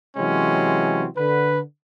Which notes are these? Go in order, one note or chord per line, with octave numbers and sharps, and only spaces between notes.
C3 E3 F#3 G#3 C4 C#4
D3 B4